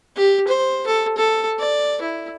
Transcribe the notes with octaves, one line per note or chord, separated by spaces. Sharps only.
G4
C5
A4
A4
D5
E4